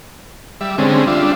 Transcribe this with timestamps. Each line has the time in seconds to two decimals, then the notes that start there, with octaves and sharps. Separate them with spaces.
0.61 G3 E5
0.78 D3 G3 G#3 C4 C#4
1.07 G3 D4 F4 E5